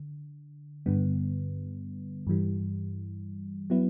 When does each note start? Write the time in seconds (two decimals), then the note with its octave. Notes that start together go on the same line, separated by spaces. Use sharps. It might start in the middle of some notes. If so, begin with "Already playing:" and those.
Already playing: D3
0.86 G2 D3 G3 B3
2.27 G2 E3 G3
3.70 F#3 B3 E4